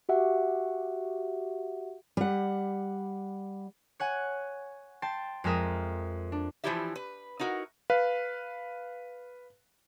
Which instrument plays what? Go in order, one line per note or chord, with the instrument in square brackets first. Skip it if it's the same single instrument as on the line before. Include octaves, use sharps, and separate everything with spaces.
[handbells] F#4 G4 E5 F#5
[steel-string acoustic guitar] G3 F#5
[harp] C#5 F#5 G#5
G5 A5 C6 A6
F2 G#3 A4 A#4 E5 D#6
D4
[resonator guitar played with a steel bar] E3 F3 D4 E4 G4 E5
B4
D#4 E4 F#4 A#4
[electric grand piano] B4 F5